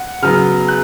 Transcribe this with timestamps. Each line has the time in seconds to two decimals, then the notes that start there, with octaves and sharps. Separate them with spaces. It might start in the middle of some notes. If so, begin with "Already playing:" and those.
Already playing: F#5
0.22 C#3 F#3 B3 F6
0.68 F#6